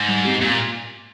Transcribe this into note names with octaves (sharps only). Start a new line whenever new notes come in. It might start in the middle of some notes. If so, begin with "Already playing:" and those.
Already playing: G#2
G3
C4 G4
A#2 A#3